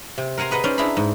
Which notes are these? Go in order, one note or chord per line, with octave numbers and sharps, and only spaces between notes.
C3
A#4 F#5 G#5 A#5 C6
G#4 B4 D#5 F#5
C#4 D#4 C5 D5
D4 E4 G#4 A#5 B5
G#2